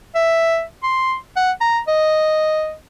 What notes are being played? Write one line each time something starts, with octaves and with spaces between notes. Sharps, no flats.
E5
C6
F#5
A#5
D#5